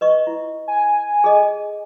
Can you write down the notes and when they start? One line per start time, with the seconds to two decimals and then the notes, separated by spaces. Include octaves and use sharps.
0.01 B4 D#5 C#6
0.27 E4
0.68 G#5
1.24 G#4 A4 D#5